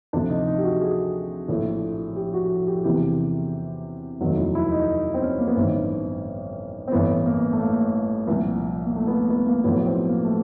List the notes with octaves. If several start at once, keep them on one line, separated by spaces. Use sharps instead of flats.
D2 C3 F3 D4
D#4
D#4
G4
F#4
G#4
A#1 A2 F3
G4
F#4
G4
E2 C3 E3 G4
F1 D#2 D#3 F#3
E4
E4
D#4
C4
C#4
A#3
B3
A1 G2 D#3 C4
C4
A1 G2 E3 B3
A#3
A3
A#3
C2 A#2 F3
A#3
A3
B3
A#3
B3
A#3
B1 A2 F3 B3
C4
A#3
A3